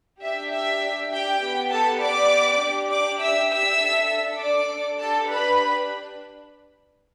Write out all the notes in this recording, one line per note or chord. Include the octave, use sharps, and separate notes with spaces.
D4 G4 E5
E5
G4 G5
B3 G4
A4 A5
D5 D6
D4 G4
D5 D6
E5 E6
E5 E6
D4 A4
D5 D6
D4 G4 A4 A5
B4 B5